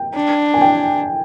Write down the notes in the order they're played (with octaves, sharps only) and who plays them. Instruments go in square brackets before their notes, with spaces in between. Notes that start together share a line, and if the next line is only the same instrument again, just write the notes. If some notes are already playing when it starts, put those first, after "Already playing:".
Already playing: [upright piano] G5
[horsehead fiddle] D4
[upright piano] G#5
G5